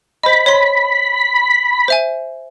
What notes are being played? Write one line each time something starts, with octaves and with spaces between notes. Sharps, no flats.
C5 D#5 B5
C#5 C6
C5 E5 G#5